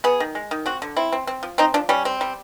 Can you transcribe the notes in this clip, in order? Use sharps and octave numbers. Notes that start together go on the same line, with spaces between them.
B3 G#4
D#3
G#3
D#3
C4 F#4
D3
C4 E4
C4
C4
F3
C4 D#4
F3 D4
G3 C#4
C4
G3